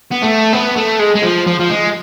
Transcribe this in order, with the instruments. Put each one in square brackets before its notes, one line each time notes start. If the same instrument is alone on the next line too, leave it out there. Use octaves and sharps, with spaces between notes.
[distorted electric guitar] B3
A3
B3
A3
G#3
G#3
F3
F3
F3
G#3